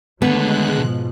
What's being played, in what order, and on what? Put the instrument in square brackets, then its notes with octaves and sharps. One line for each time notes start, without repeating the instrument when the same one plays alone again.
[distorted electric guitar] D#2 D3 [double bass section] F#3 A3 [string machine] G#3 F#6 [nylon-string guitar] B3
[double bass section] G#2 B2 F3